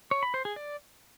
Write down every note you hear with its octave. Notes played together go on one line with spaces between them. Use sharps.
C#5
B5
C5
G#4
D5